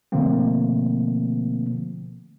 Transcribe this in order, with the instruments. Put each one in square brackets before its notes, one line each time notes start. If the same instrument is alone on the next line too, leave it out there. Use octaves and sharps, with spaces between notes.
[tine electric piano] B2 D3 F3 A3 A#3 C4